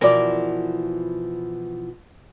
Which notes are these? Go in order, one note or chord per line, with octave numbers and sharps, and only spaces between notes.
B2 E3 F3 A#4 D5